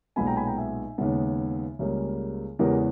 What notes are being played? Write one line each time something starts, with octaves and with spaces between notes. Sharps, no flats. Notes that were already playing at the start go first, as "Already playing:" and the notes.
B1 A#2 G#3 B3 G#5 B5
G5 A#5
G#5 B5
G5 A#5
E5 G#5
D#2 C#3 G#3 B3
C#2 C#3 G3 A#3
E2 C#3 E3 G#3 B3 G4 A#4